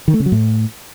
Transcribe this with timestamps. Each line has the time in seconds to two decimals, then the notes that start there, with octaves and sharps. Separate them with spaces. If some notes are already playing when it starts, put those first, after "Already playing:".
0.08 D#3
0.14 A3
0.20 C#3
0.26 F#3
0.32 A2